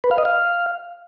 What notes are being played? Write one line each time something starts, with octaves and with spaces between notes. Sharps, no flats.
B4
F5
D#5
F5